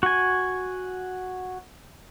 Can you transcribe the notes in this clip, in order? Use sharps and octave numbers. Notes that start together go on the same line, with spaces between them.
F#4 G#5